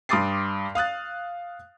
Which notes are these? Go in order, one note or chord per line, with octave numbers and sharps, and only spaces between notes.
G2 C6 D6 D#6 A6 C7
F5 D#6 F#6 A6